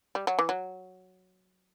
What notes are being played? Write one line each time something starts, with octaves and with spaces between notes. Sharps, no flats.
G3
F#3
E3
F#3